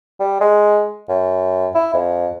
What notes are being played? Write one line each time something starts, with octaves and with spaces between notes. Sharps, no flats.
G3
G#3
F#2
E4
F2